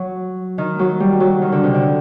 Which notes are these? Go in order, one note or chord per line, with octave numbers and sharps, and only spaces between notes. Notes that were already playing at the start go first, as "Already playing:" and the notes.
Already playing: F#3
D#3
F#3
G3
F#3
D#3
D3
C3
D3